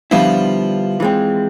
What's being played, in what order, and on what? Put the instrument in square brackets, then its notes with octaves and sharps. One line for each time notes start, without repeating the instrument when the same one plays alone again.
[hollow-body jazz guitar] D3 G3 B3 E4 [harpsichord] F3
[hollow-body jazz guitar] E3 G#3 C4